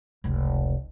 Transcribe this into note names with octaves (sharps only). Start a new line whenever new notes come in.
F1 C#2